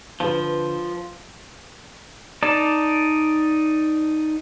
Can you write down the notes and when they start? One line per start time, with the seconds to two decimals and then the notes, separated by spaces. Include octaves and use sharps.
0.20 D3 F3 B4
2.43 D#4 D5 A5